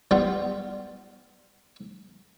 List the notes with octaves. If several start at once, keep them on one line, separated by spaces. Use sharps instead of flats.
G3 B3 F4